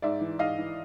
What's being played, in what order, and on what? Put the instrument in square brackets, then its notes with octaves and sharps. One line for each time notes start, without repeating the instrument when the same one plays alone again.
[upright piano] G#2 D5 E5
E3
G#2 D#5 F5
E3